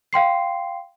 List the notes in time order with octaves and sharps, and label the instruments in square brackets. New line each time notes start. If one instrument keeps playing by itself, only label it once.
[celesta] F5 G5 C6 C7